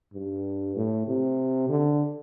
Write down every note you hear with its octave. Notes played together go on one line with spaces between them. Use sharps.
G2
A2
C3
D3